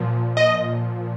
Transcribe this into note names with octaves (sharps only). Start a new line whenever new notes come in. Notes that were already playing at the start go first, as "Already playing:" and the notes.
Already playing: A#2 F3
D#5